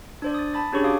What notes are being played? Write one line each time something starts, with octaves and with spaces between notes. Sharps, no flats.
D4 C5 D5
D#6 A6
A5 B5 A6
C#4 D4 G4 G#4 C#5 C#6
F#4 F5 D6 D#6